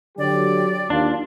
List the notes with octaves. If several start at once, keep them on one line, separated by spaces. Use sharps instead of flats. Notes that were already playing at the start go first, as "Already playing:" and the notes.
D3 F#3 G4 D5
D#2 D4 F4